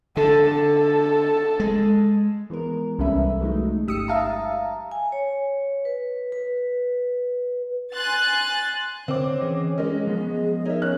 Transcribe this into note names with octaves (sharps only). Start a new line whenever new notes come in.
D3 A4
A4
G#3
E3 G#3 B3 A#4
C2 G3 C#4 A4 B4 E5
F#3 G#3 A3 D#4
G1 G4 D#6 E6 C#7
E5 F5 A5 A#5
G#5
C#5
B4
B4
G#5 C6 F#6 A6
D3 C4 C#5 D6
E3 C#4 G#4 D#5
G#3 C#4 A#4 D#5
F3 B3 G#4
D#4 A#4 C#5 E5
C#4 F#6